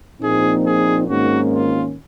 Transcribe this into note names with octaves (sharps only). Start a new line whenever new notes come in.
A#1 A#2 F3 C4 D#4 G#4
G#4
G#1 G#2 D#3 A#3 C#4 F#4
F4